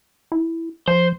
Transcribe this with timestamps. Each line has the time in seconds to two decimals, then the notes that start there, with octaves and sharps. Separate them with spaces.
0.32 E4
0.88 F3 C5